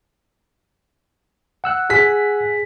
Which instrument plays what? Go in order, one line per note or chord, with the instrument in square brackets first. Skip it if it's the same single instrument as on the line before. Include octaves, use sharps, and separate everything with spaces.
[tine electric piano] F#5 E6 F#6
[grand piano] G#4 B6